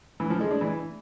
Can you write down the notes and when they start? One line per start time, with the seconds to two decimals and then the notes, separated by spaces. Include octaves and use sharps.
0.20 E3
0.30 F3
0.40 G#3
0.51 D4
0.61 E3